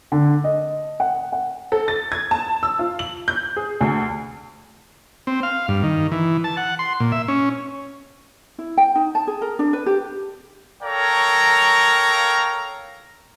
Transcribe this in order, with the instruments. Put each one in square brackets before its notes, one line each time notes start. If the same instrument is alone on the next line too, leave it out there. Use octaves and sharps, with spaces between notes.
[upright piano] D3
D#5
F#5
F#5
[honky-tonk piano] A4
A6
G#6
A5
E6
F4
F#7
G6
G#4
D2
[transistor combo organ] C4
F5
G2
D#3
E3
A5
F#5
C6
A#2
E5
C#4
[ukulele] E4
G5
D#4
A5
G#4
A#4
D4
B4
G4
[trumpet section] A4 A#4 C#5 F5 G5 A#5